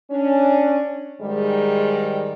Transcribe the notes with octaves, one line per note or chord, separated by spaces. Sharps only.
C#4 D4
G#2 D#3 G3 G#3